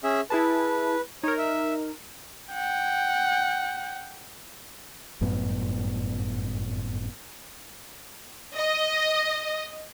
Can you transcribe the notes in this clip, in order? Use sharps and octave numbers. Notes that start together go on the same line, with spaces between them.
C#4 G#4 E5
E4 G#4 B4 A5
D#4 A#4 C#5
E5
F#5 G5
G1 F#2 A2 B3
D#5